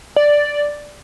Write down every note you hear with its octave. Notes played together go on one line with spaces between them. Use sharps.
D5